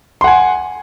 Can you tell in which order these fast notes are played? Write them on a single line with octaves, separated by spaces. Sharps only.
C6 F#5 G#5